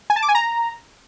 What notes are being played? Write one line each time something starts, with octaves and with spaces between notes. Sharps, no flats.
G#5
A5
D6
G#5
A#5